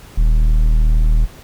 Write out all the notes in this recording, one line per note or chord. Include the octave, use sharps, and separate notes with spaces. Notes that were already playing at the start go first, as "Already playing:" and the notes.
D#1